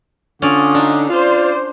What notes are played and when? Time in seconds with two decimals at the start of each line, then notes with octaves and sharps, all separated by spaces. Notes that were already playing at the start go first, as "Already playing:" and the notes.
0.42 D3 C#4 F4 D5 D6 D#6
0.74 D4 D#4
1.10 F4 C5 D5